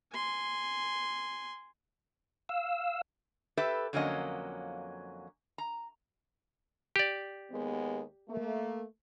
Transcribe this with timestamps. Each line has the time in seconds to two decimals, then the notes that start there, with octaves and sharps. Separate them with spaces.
0.13 G#5 C6
2.49 F5 E6
3.57 G4 A4 B4 E5
3.93 F2 D3 F#3 A#3 C#4 D#5
5.58 A#5
6.96 G4 D5
7.52 D#2 G#3 B3
8.29 A3 A#3